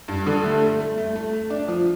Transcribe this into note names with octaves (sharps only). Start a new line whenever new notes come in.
G2
D3
A3
A3
A3
A3
A3
A3
D4
F3